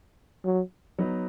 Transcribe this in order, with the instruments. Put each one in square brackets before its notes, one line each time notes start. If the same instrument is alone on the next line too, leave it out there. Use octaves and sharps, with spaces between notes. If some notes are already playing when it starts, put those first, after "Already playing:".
[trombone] F#3
[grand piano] F#3 B3 D#4